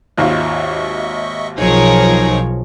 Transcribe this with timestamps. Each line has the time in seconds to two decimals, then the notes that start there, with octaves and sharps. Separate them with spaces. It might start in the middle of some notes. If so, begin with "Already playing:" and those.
0.18 G#1 D#2 F4 D#5 E5 C#6
1.58 B1 F3 F#3 D#4 G#4 A#4 C#5